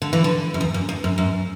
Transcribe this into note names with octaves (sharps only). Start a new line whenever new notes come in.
D3
E3
D3
F#2
E2
F#2
E2
F#2
F#2